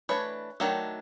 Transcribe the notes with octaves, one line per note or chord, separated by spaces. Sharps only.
E3 A3 D4 B4 C#5
D#3 F#3 A3 D4